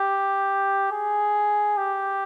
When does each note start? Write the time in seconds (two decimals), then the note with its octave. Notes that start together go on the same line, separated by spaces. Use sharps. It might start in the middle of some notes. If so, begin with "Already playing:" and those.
Already playing: G4
0.92 G#4
1.77 G4